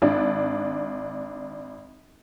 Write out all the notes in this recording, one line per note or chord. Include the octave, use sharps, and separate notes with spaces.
G#1 D4